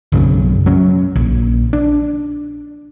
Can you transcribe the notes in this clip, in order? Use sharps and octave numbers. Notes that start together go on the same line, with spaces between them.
B1 F#2 C#3 F#3
F#3 C#4
A#1
D4